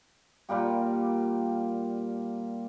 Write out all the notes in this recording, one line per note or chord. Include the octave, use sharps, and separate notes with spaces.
A#2 G3 A#3 G4